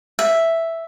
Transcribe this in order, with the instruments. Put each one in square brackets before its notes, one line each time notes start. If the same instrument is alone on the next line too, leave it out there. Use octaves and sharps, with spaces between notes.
[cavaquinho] E5